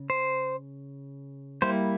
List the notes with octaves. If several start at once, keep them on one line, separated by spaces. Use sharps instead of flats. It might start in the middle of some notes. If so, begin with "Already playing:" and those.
Already playing: C#3
C5
G3 A#3 E4 C5